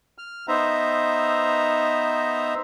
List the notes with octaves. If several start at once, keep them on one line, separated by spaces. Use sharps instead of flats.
F6
B3 D#4 C5 E5 A#5